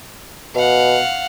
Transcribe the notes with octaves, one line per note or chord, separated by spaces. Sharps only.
B2 F5 F#5